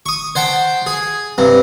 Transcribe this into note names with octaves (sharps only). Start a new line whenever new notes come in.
C#6 D#6
C5 F#5 G5 A5
G#4
G2 C3